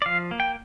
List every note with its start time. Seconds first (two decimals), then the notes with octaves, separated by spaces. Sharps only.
0.02 D5
0.06 F3 F5
0.31 A#3
0.40 G5